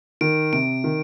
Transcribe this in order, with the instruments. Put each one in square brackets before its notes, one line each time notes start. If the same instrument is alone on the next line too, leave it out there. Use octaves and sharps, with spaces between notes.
[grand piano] D#3 [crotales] D7
[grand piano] C3 [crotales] D7
[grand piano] D#3